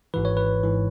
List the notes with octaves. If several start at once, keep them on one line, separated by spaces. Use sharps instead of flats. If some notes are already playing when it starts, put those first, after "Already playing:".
G#1 G#2 E3 B4
C#5
B4
G#2 E3